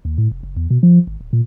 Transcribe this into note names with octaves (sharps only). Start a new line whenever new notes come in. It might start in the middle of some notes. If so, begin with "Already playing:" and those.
D#2
A2
F1
F#1
E2
B2
F3
G#1
D1
A#2